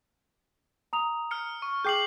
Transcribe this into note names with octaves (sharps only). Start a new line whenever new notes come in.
A#5 D#6 F7
F6 C#7
C#6
G#4 G5 D6 G6 C7 F#7